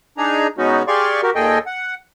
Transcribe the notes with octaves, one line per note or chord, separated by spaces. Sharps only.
D4 D#4 G#4 A#5
B2 G#3 B3 C#4 D#4 F#4
G4 G#4 D5 F5 C6 C#6
F#4 G4 A#4
D#2 A#2 G#4 A4 D#5 G5
F#5